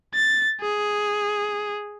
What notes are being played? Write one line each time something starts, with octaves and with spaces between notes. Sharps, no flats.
A6
G#4